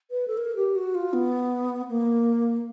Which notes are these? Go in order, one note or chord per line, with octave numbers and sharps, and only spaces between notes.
B4
A4
A#4
G4
F#4
F4
B3
A#3